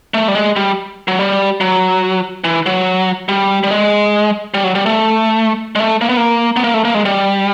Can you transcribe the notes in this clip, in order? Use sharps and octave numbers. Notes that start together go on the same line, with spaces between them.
A3
G3
G#3
G3
F#3
G3
F#3
E3
F#3
G3
G3
G#3
G3
F#3
G3
A3
G#3
A3
A#3
B3
A#3
B3
A#3
A3
A#3
G#3
G3